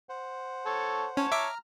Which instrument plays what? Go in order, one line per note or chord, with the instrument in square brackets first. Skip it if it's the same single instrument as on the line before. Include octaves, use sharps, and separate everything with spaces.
[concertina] C5 F#5
[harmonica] A4 C#5
[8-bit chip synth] C#4 [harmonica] C#5 A5
[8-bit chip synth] E5 D6 [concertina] A#5 F6